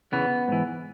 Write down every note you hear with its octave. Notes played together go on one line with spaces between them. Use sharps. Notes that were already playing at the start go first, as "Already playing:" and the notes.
E2 C#3 E3 B3
G#2 E3